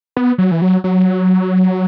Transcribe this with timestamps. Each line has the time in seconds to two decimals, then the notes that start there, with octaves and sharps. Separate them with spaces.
0.17 B3
0.38 F#3
0.51 E3
0.62 F#3
0.84 F#3